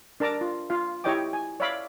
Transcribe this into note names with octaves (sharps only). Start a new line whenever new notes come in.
D4 A#4 A5 A#5 D6
F4
F4 F5
E4 G4 C#5 D#5 G5 D6
G#5
C#5 D5 E5 F5 B5 D6